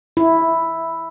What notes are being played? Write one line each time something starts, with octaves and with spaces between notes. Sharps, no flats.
E4